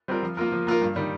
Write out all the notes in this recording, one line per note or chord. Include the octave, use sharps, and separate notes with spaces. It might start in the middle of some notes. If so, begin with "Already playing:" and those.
G3 C4 F4 A#4
F3
A#3 F4 A#4
F3
A#3 F4 A#4
G2
D#3 G3